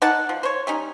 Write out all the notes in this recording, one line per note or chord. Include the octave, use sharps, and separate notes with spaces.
D#4 D5 F#5 A5
F3
C5 C#5
G3 C#4 D#4